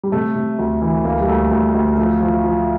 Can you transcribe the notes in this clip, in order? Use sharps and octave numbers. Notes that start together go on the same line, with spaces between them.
G3
C3 A3
C3
D2
E3
D2 A#3
G3
D2 A3
D2 A3
D2
F3 A3
F3
F3